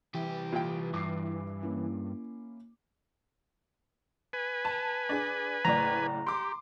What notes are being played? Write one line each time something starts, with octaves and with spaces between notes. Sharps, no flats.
C2 E3 G4
A#2 G5
G2 D6 C7
A#3 C#4 E4
B4 G#5
A5
D4 G#4
F#1 A2 D5 A#5
G4 C6 D6